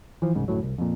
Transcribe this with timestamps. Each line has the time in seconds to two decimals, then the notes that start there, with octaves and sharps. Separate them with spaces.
0.22 E3 F3
0.35 C2 G#2 C#3
0.48 D1 F#2 A2 F#3
0.63 C2
0.78 F2 A#2